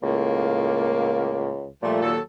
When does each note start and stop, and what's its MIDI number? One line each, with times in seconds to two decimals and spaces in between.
0.03 1.72 37
0.03 1.52 45
0.03 1.52 58
1.82 2.13 46
1.82 2.00 53
1.82 2.00 55
1.82 2.00 57
2.02 2.20 39
2.02 2.20 54
2.02 2.20 69